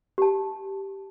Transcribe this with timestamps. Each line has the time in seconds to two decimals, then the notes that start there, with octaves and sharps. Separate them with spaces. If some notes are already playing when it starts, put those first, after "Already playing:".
0.18 G4 A5